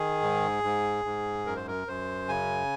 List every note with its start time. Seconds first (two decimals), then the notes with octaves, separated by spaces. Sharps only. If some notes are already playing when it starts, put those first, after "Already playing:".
Already playing: D#3 G#4
0.22 G#2
0.64 G#2
1.05 G#2
1.46 F#2 A#4
1.56 C5
1.67 A#4
1.88 F#2 C5
2.29 C#3 G#5